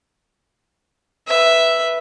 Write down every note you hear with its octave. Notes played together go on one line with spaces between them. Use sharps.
B4 E5